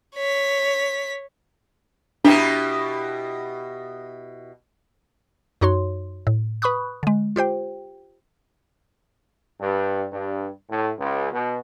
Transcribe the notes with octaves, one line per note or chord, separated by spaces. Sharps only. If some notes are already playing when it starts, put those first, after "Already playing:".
C#5 B6
B2 D4 E4 G4
F#2 D#4 F#4 C#5 C6
A2
B4 B5 C#6 D#6 F#6
D3 G#3
F4 G4 C5 G5
G2
G2
A2
C#2
B2